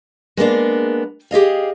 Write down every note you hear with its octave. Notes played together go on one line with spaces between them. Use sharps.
G#3 A#3 B3 D4
G4 G#4 D#5 F5